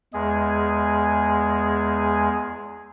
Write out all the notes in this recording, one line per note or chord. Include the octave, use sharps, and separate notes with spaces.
E2 G#3 G#4